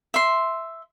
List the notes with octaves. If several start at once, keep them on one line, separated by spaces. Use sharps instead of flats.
E5 C6